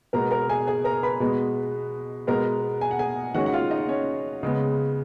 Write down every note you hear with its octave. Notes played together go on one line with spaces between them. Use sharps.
B2 G#3 B3 A#4 A#5
A#4 A#5
G#4 G#5
G#4 G#5
A#4 A#5
B4 B5
B2 G#3 B3
B2 G#3 B3 A#4 A#5
G#5
F#5
G#4 G#5
D#3 G#3 C#4 F#4 F#5
F#5
F4 F5
D#4 D#5
C#4 C#5
C#3 G#3 B3